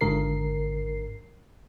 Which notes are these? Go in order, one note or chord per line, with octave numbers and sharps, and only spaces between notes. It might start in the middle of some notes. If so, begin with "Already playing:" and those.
G#1 G#2 D3 A#4 C7